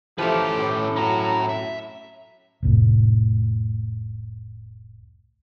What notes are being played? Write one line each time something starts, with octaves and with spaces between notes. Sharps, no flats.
E3 F3 A3 C#4 G4 A4 B4
A2
C#4 F#4 A#5
E5
F1 C2 A2